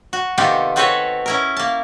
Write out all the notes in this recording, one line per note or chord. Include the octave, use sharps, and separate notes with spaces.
F#4
C3 D#3 B3 F4 G4 A4
B3 C4 F#4 A4 B4 C#5
C#4 E4 A#4
A#3 A5